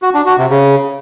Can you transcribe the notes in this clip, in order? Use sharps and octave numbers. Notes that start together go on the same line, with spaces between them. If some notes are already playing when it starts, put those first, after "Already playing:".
F#4
D4
F#4
C3
C#3